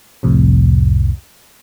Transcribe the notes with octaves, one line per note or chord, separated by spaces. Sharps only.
C2 F2 A2 C3